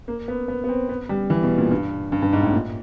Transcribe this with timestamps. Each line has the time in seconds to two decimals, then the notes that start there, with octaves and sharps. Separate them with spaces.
0.08 A#3
0.28 B3
0.48 B3
0.64 B3
0.69 C4
0.89 B3
1.09 G3
1.30 E3
1.43 B2
1.58 A#2
1.71 G2
2.12 G2
2.22 G2
2.33 G#2
2.43 A2
2.53 A#2